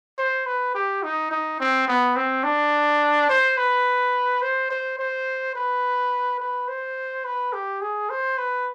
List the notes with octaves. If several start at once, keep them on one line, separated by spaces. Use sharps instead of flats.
C5
B4
G4
D#4
D#4
C4
B3
C4
D4
C5
B4
C5
C5
C5
B4
B4
C5
B4
G4
G#4
C5
B4